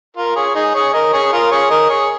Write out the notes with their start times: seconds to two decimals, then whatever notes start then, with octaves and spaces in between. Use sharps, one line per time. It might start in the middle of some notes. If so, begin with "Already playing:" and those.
0.17 F4 A#4
0.36 G#4 C#5
0.55 D#4 G#4
0.75 G#4 C#5
0.94 A#4 D#5
1.13 G#4 C#5
1.32 F4 A#4
1.51 G#4 C#5
1.70 A#4 D#5
1.90 G#4 C#5